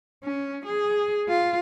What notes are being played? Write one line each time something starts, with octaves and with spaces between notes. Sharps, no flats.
C#4
G#4
F4